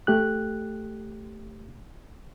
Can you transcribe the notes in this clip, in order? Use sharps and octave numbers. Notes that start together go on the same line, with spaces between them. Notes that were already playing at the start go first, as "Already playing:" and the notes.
A3 G4 F#6